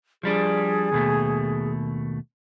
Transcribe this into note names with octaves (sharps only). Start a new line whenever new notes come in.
F3 G3 D4 G#4
D#2 B2 A3